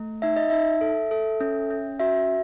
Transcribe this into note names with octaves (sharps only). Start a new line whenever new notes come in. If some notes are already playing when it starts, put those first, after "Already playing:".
Already playing: A3
D#4 E5
D#5
D#4 E5
A4
A4
C#4
C#4
F#4 E5